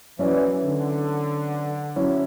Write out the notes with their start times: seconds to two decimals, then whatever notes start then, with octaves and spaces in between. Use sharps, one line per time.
0.19 E3 F#3 C#4 E4 B4 D5
0.63 D3
1.96 F#3 C#4 E4